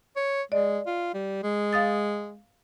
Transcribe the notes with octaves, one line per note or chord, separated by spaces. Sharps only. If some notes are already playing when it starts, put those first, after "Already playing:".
C#5
G#3 D5 D#5
F4
G3
G#3
F5 D#6 A6